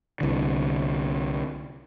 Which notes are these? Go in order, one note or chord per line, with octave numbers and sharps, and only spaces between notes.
C2 D3